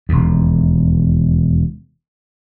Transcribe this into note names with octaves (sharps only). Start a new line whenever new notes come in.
E1 D#2